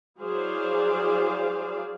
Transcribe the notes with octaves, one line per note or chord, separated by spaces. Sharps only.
F#3 E4 G#4 C5 D5 F5